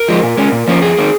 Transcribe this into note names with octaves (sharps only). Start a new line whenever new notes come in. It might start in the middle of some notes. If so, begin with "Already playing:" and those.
Already playing: A#4
F3 G#3
A#2
G#3 C#4
A#2
F3 A#3 C#4
F2 G#4
D#3 A#3